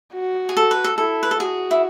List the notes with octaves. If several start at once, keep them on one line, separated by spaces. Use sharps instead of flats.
F#4
G#4
A4
B4
A4
E4 A4
B4
A4
F#4 G#4
E4